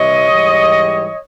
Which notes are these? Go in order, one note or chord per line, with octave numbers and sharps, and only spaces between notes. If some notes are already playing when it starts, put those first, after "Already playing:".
Already playing: C3 E3 G3 C#5 D#5
G#2 E3 G3